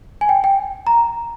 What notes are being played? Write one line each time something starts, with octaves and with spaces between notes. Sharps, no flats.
G#5
G5
G5
A#5